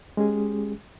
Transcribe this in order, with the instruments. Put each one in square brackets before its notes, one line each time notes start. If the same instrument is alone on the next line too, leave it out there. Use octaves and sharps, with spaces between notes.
[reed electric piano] G#3 C#4 G4 G#4